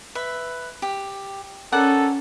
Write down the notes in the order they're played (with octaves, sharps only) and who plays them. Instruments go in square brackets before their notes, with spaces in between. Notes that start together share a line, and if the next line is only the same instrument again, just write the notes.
[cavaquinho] B4 E5
G4
[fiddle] C#4 [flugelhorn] A4 [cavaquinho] A#4 D5 F#5